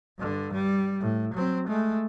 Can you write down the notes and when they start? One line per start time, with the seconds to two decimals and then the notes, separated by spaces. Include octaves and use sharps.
0.19 G2 D3
0.53 G3
1.01 A2
1.34 F#3 C4
1.68 G#3 A3